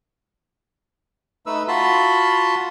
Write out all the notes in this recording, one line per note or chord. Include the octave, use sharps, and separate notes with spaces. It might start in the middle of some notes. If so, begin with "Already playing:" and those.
A3 D#4 B4 E6
F4 F#4 A5 B5 C6